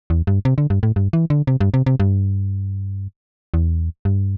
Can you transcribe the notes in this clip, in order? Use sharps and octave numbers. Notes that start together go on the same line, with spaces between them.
E2
G2
C3
D3
G2
A2
G2
E3
D3
C3
G2
C3
C3
G2
E2
G2